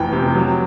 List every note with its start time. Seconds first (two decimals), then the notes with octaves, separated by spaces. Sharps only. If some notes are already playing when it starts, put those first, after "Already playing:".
Already playing: F1 F2 E3 G5
0.13 C3
0.35 F#3